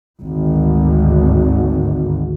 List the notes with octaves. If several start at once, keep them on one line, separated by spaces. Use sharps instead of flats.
G#1 D2